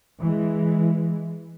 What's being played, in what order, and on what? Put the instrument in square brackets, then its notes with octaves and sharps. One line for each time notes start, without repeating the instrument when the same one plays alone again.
[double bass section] E3 G#3